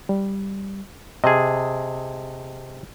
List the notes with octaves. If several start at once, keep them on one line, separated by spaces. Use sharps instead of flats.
G3
C3 G#4 D#5 A5